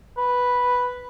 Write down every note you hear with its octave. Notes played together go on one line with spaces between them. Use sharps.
B4